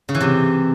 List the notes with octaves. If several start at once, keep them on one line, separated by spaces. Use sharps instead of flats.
C#3
E3
C3